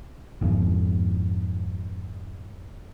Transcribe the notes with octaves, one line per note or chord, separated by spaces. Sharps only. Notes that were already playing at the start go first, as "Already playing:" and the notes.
G#1 F2 G#2